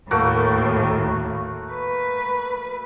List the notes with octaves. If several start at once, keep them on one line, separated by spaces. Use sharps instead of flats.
D#2 A2 A3 A#3 F#4
B4